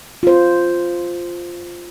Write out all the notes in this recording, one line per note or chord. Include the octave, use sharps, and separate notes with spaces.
F4 C5